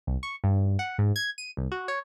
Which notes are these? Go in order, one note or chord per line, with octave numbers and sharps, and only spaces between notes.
C2
C#6
G2
F#5
G#2
G#6
D#7
C2
F#4
C#5